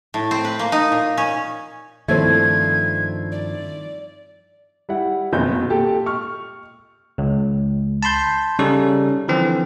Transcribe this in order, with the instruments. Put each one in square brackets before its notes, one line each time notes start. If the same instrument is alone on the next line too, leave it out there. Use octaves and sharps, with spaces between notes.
[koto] A2
C4
B4
A#3
D#4
A#2
C#4
[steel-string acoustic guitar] G2 D#3 F3 [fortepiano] A3 C4 E4 [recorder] G#6
[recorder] D5
[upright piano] G3 E4 F#5
F#1 B1 F2 D#3 B3 G6
B2
A#2 G4 A4 A5
C#6 F6
[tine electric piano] C#2
A5 B5 C6 G6
C#3 G3 C#4 D#4 A4
D3 E3 F3 C4